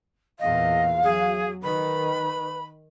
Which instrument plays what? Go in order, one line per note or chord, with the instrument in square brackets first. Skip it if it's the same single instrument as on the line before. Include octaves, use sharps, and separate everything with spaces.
[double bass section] E2 A#2 [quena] D#5 [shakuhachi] F5
[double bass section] F#3 [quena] G#4
[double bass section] D#3 [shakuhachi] B4 [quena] B5